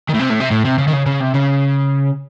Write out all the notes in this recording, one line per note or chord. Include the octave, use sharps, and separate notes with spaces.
D#3
A2
C3
A2
C3
A2
C3
C#3
D#3
C#3
C#3
C3
C#3